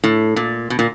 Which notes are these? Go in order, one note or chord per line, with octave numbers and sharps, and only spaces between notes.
A2
A#2
B2
A#2